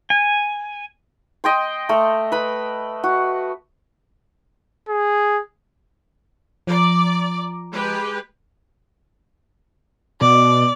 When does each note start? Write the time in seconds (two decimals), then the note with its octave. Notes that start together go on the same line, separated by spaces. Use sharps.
0.10 G#5
1.44 D#5 G5 C6
1.89 A3
2.32 B4 B5
3.04 F#4
4.89 G#4
6.67 F3 D5 A#5
7.72 G#3 G4 B4
10.21 B2 D5